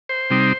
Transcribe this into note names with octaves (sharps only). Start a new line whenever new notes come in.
C5
C3 G3 C4 D#4